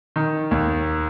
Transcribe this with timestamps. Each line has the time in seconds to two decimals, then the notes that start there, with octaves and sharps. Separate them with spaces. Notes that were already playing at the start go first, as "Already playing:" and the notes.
0.16 D#3
0.51 D#2